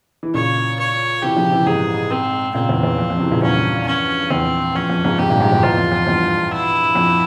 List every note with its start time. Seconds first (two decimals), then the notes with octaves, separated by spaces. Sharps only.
0.23 E3
0.34 A#2 C#3 C#5
0.79 C#5
1.22 C3 E3 G4
1.36 C#3 F3
1.51 C3 E3
1.66 G#2 C3 G#4
2.10 C4
2.54 A#2 C#3 C4
2.69 E2
2.83 E2
2.98 F2
3.10 F2
3.17 C#3
3.20 C3 E3
3.31 A#2 C#3
3.42 E2 G2 C#4
3.86 C#4
4.30 E2 C4
4.75 F2 C#4
4.90 F2
5.04 F2 G#2
5.18 G#2 C3 G4
5.29 G2 A#2
5.40 F2 G#2
5.52 E2 G2
5.63 E2 F4
5.77 F2
5.92 F2
6.07 E2 G2
6.51 E4
6.95 F2